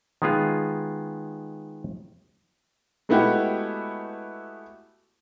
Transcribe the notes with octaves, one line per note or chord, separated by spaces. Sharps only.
D#3 G#3 B3 F4 G#4
G#3 A3 B3 E4 F#4 G4